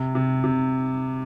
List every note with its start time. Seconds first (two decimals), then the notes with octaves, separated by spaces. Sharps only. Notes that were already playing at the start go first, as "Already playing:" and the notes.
Already playing: C3
0.15 C3
0.44 C3